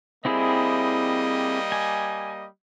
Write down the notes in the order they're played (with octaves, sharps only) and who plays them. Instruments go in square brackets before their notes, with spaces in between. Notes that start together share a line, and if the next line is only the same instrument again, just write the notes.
[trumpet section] G3 A#3 D#5 [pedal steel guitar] C4 E4 G#4
[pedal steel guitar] G#5